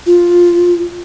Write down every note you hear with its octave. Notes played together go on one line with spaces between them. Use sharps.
F4